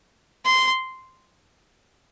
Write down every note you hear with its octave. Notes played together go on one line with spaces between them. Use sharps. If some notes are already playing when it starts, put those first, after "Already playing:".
C6